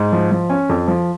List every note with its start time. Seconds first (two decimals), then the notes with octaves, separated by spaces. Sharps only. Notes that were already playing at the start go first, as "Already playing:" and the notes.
Already playing: G#2
0.12 F3
0.32 F3
0.50 C#4
0.69 F2
0.88 F3